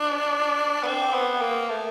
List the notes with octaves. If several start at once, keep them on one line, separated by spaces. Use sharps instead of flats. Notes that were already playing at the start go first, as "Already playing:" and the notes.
Already playing: D4
B3
C4
B3
A#3
A3